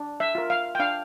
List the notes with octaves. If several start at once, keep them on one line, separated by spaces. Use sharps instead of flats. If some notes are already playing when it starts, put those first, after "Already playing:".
Already playing: D4
E5
F4 A#4
F5
G5
D4 F5